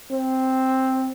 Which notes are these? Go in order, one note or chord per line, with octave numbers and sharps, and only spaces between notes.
C4